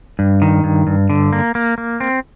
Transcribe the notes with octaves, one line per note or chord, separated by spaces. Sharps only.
G2
D#3
G2
G2
D3
A#3
A#3
A#3
C4